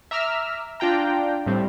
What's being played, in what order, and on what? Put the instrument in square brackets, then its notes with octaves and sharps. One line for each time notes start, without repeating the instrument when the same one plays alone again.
[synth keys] E5 A#5 D6 E6 F6
D4 F4 G5 A#5
A2 G3 C4